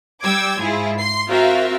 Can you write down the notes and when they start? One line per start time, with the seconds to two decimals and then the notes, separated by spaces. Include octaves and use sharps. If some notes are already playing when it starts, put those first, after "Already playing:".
0.23 G3 G5 D6 E6 G#6
0.60 G#2 E4 F4 G#4
0.97 C6 C7
1.29 C4 F4 F#4 A#4 E5 F5